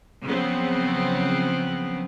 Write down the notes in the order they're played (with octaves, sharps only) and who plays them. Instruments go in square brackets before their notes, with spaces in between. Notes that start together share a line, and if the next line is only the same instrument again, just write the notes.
[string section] C#3 F3 F#3 B3 C4